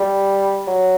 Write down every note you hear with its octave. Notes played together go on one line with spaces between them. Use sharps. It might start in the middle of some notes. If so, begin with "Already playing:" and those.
Already playing: G3
F#3